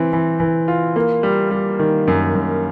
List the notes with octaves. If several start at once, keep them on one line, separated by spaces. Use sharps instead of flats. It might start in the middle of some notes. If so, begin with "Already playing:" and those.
Already playing: E3 C4
E3
E3
F4
A#3
G3
G3
D#3
F#2
F#2